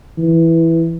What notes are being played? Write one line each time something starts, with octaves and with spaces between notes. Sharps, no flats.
E3